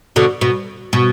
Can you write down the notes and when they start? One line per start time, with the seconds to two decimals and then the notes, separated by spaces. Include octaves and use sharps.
0.16 B2 D3
0.41 B2
0.93 B2